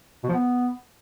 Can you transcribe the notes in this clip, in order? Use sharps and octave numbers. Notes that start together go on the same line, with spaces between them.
B2
F3
B3